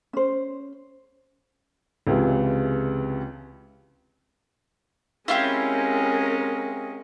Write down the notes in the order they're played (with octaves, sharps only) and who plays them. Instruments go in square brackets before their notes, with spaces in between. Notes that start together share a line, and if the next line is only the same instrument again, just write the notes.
[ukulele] C#4 C5
[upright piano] C#2 C3 E3 G#3
[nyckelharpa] G#3 C#4 [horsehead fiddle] C4 A#4 [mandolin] E4 F4 G4